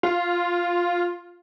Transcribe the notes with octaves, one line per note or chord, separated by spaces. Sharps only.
F4